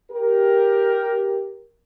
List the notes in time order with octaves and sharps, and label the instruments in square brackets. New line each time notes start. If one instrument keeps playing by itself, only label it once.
[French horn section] G4 A#4